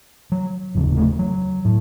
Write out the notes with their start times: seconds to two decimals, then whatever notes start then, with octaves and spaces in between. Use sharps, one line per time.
0.32 F#3
0.75 F1 D#2 C#3
0.97 A3
1.19 F#3
1.65 A2